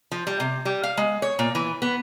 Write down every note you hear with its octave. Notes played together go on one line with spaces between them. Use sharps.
F3
G3
C3
G3
F5
G#3
C#5
A#2
E3
B3